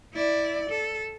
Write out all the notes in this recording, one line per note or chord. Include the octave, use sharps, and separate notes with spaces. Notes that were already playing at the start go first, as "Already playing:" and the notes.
E4 D5
A4